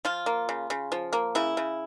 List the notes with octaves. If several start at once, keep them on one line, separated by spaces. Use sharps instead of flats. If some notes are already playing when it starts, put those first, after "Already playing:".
F3 F4
A#3
C#3
C#3
F3
A#3
C#3 E4
C#3